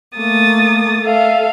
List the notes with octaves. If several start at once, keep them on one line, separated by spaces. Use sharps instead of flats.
A3 A#3 D#6 A6
A4 E5 F5